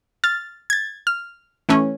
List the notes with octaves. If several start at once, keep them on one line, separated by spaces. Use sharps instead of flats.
F6 A6
G#6 A6
F6
E3 A3 C#4